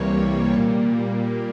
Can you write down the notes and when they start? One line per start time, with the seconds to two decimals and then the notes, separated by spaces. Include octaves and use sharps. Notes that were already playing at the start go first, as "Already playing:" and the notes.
Already playing: C2 C3 E3 G3 A#3 C#5
0.53 A#2 G3 A#3